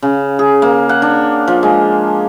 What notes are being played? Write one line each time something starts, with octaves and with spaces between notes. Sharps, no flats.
C#3
G#4
A#3
F#5
D4
F3
G#3